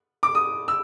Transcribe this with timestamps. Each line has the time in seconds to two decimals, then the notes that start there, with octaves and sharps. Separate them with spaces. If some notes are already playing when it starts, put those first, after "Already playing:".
0.23 D6
0.35 D#6
0.68 E6